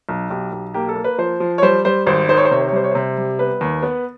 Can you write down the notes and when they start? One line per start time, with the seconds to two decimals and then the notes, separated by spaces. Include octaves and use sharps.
0.09 B1
0.30 B1 G4
0.52 B1
0.74 A#3 G4
0.89 A4
0.96 A#3
1.04 B4
1.18 F3 C5
1.40 F3
1.58 C#5
1.62 G3 C5
1.85 G3 C5
2.06 G#1 C5
2.29 D#3 C5
2.37 C#5
2.45 C5
2.51 C3 C#5
2.61 C5
2.68 C#5
2.72 G3 C5
2.84 C#5
2.91 C3 C5
3.17 G3
3.39 B3 B4
3.61 D#2
3.83 B3